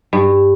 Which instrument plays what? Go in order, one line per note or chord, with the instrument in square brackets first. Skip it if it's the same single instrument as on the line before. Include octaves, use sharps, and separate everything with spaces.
[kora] G2